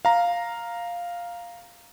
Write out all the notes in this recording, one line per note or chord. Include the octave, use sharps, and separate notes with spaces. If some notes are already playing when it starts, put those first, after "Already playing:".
F5 A#5